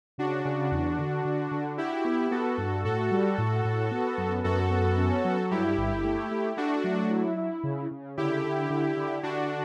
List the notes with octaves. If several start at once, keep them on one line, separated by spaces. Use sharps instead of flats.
C#3 D4 F#4
C#3
E2
D3
D3
D3
E4 F#4 G4
B3
B3 F#4 A4
G2
A2 F#4 A4
G3
A2
A2
B3
F#2
F#2 F#4 A4
B3
C#4
F#3
G2 E4 G4
G1
A3
A3
A3 D4 F#4
F#3
E4
E4
C#3
C#3
D3 E4 G4
D3
D3
D3
D3 D4 F#4